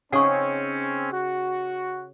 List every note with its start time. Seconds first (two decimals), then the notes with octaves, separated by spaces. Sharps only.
0.13 C#3 C4 C#4 D#4 G#4 F#5 C#6
1.13 F#4